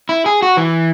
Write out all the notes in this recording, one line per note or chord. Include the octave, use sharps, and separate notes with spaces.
E4
G#4
F#4
E3